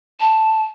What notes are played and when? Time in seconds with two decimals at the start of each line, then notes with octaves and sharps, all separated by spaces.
0.20 A5